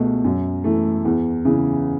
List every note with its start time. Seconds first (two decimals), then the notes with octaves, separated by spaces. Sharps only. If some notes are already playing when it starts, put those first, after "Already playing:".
Already playing: C#2 B2 A3
0.24 F#2
0.64 E3 A3
1.05 E2
1.45 C#3 E3